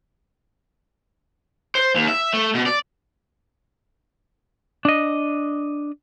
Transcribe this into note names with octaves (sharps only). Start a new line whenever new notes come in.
C5
D#2
E5
A3
B2
D5
D4 D#5